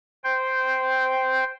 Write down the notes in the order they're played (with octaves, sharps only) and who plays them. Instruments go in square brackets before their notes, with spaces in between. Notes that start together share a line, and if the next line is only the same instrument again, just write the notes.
[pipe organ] C5 G5